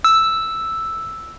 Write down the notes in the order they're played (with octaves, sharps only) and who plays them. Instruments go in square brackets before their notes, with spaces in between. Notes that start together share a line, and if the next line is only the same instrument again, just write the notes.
[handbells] E6